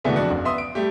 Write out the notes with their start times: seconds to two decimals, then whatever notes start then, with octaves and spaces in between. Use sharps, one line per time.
0.04 B2 D3 E3 G#3 A3 B3
0.16 F2 D4 F#4 D5 F#5
0.30 F#1
0.45 B3 E5 C6 D#6
0.58 D7
0.75 G3 A3 G4